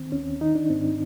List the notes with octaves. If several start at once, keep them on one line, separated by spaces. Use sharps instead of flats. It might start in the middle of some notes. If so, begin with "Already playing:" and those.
Already playing: D#3 C4
D#2 C#4
D#3 D#4
D4
G#2 C4